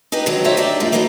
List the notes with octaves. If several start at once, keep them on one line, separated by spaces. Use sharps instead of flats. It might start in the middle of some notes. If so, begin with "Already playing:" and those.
D#4 G4 G#4 B4 D#5
D3 D#3 F#3 G#3 C4
D#4 F#4 G4 C5 C#5 E5
D4 D#4 G4 D5 E5
F#2 D3 G#3 A#3 F4
E3 A#3 B3 D#4 F#4 A4